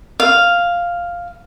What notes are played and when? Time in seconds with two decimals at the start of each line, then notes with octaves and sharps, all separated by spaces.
0.20 F5